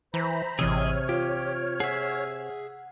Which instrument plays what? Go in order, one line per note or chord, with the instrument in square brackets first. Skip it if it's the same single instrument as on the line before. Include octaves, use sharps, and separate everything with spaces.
[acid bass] E3 [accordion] C5 A#5 B5
[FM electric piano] A1 E3 E6 [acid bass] C3 [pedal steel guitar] G#4 D#5 [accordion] C#5 F6
[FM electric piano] F4 [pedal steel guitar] G4
[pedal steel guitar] G#4 E5 [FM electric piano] F#5